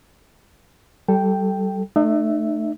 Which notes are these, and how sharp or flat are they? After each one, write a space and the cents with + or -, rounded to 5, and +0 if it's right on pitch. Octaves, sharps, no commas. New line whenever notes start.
G3 -30 A4 +0 G5 +0
A3 +0 D#4 -40 E5 +0